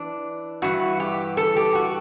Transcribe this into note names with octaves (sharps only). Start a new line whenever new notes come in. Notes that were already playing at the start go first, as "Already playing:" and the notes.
Already playing: E3 D4
G2 E3 F#4
G4
A4
G4
F#4